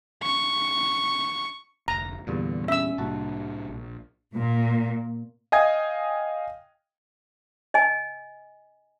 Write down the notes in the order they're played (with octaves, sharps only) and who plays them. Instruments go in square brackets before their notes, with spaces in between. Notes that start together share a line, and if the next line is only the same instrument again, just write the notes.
[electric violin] C#6
[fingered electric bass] F1 D2 [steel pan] A#5
[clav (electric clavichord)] E2 G2 A#2 [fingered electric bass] D3
[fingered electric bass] C#4 [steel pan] E5 E6
[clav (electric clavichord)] C2 F#4 A5 [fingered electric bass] A2 A#3 D4
[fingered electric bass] A#1
[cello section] A#2
[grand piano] D#5 F5 G5 G#5 D#6 G#6
[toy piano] D#5 G#5